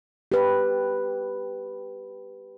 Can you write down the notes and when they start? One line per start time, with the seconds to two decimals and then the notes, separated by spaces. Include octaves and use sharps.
0.32 G4 B4